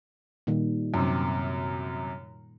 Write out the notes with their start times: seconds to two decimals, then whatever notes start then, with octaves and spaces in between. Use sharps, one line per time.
0.47 A#2 D#3 G3
0.94 F#2 C3